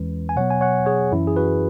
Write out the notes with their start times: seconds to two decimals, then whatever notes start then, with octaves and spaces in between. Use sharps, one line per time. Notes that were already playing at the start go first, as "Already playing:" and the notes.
Already playing: E2 E3 G#3 C#4 B4
0.29 G#5
0.36 B2 F#3 B3 C#5 F#5
0.50 G#5
0.61 C#5 F#5
0.86 G#4 C#5
1.12 F#2 E3 C#4 E4
1.27 G#4
1.36 F#4 B4